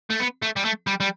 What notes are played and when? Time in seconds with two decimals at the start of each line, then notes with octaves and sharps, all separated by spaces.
0.10 A3
0.20 B3
0.42 A3
0.56 G3
0.65 A3
0.87 G3
1.00 G3